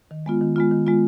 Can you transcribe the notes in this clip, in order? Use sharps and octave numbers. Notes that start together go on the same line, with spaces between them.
D#3
G#3 B3 F4
D#3
G#3 B3 F4
D#3
G#3 B3 F4